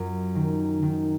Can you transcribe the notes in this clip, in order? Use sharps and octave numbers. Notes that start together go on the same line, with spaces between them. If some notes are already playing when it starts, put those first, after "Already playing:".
Already playing: F#2 F4
D#3
D#3